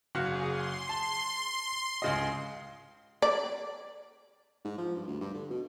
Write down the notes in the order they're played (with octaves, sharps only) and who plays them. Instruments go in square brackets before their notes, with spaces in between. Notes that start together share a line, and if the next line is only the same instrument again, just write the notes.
[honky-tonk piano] F#1 F#4 F5 [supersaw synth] G#4
[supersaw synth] C6
[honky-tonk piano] A5
C#2 C#3 D#5
[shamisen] D5
[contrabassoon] G#2
F3
G2
D2
G2
D3
B2